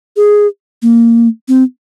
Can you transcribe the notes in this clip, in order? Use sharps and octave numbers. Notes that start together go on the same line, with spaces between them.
G#4
A#3
C4